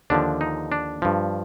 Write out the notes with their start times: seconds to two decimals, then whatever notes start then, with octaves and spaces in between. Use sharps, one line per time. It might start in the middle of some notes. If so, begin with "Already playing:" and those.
0.10 D#2 D3 F3 D4
0.41 D#4
0.72 D4
1.02 G2 F3